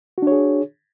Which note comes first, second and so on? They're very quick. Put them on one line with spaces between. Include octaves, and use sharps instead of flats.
F#4 D4 C#5 G#4